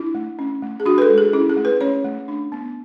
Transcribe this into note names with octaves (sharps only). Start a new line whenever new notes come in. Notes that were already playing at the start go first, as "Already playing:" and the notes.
Already playing: D4 E4
A3
C#4
A3
G#4
D4 F#4
B4
A4
G#3
G#4
C#4 E4
G#4
A3
B4
C#4 C#5
A3
D4
B3